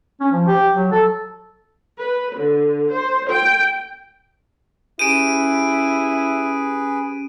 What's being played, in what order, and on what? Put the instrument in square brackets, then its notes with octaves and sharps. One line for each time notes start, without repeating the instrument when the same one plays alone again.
[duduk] C#4
F3
G4
F#3
A4
[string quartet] B4
D3
C5
G5
[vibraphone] C#4 G4 [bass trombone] E4 [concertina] G#4 B4 [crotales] D7 D#7